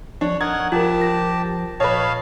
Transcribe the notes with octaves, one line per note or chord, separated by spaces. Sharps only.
F3 D4 C#5
D#1 A#4 D#5 F#5 G#6
F3 F4 G4 A#4 A5
A#6
A#2 B4 C#5 D#5 F5 A5